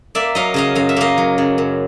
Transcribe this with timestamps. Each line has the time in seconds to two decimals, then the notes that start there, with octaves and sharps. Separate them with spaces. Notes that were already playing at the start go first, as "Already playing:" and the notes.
0.15 A#3 D5 E5
0.35 F#3 D#5 F5
0.54 C#3 D#5 F5
0.75 F#2 F5
0.89 E5
0.97 A#3 D#5 F5
1.18 F#3
1.38 C#3
1.58 F#2